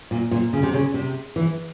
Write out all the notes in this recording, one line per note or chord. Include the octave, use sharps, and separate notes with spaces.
A#2
A#2
C#3
C3
C#3
C3
E3